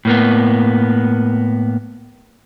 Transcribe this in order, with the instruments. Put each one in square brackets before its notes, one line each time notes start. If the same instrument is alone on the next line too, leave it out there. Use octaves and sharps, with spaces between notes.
[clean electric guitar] A2 A#3 B3